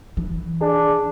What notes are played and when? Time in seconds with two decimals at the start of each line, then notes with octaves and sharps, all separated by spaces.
0.17 E3
0.61 D4 G#4